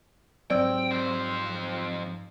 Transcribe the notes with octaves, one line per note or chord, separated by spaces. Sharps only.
G#2 F#3 C4 D5 G5 E6
F2 C5